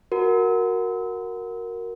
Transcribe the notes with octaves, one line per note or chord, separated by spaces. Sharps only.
F#4 A#4